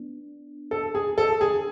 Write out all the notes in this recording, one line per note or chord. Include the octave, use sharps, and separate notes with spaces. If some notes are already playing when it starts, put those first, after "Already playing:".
Already playing: B3 D4
A4
G#4
A4
G#4